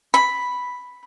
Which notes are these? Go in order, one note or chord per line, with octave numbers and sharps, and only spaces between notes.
B5